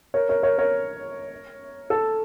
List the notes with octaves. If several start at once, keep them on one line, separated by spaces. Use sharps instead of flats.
A#4 C#5
A#4 C#5
A#4 C#5
A#4 C#5
A4